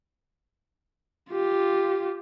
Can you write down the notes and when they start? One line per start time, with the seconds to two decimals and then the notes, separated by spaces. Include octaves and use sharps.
1.31 F4 G4